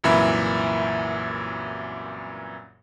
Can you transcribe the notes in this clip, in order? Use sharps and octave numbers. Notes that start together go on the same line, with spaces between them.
C2 F#2 A#2 E3 E5 B5